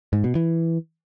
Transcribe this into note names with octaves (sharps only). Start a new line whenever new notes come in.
G#2
B2
E3